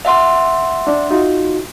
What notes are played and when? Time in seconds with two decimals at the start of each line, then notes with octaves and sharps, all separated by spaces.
0.05 E5 F#5 C6
0.87 D4
1.11 D#4 F4 F#4